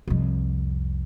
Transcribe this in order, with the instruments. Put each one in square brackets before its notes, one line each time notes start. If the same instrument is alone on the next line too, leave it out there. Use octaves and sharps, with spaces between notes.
[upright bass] C2 F2